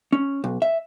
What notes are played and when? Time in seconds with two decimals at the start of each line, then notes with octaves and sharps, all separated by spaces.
0.12 C#4
0.44 B1
0.62 E5